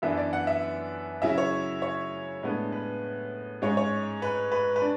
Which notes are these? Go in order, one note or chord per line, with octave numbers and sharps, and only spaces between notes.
F#2 E3 B3 D4 E5
D5
F#5
E5
C#3 F#3 C#4 E4 E5
C#5
C#5
A2 G#3 B3 D4
B4
G#2 G#3 C#4 C#5
C#5
B4
B4
B4
D4